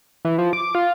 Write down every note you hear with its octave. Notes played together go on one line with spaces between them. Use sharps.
E3
F3
D6
F4